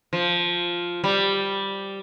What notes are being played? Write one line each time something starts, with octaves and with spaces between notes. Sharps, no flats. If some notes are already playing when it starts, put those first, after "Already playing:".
F3
G3